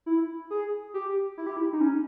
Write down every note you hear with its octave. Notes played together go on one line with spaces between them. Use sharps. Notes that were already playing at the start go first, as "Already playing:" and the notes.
E4
G#4
G4
E4
G4
E4
D#4
C#4